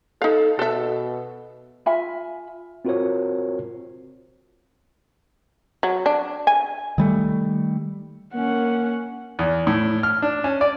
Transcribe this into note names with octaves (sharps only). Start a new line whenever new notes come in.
D#4 A4 F5
B2 A4 E5
F4 E5 G#5 B5
C4 F4 F#4 A#4 C5 C#5
F#3
D4
G#5
D#3 G3 A3
A#3 C#4 F#5
E2
A2
F6
D4
C#4
D5